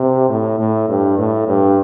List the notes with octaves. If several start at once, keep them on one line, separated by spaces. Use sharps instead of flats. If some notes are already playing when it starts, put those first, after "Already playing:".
Already playing: C3
A2
A2
G2
A2
G2